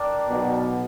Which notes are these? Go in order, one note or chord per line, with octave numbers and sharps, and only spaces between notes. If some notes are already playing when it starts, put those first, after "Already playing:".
Already playing: D4 G4 A#4 D5
B1 B2